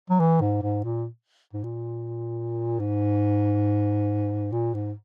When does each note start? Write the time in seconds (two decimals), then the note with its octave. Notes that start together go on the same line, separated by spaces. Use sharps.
0.10 F#3
0.20 E3
0.41 G#2
0.62 G#2
0.84 A#2
1.53 G#2
1.64 A#2
2.80 G#2
4.53 A#2
4.74 G#2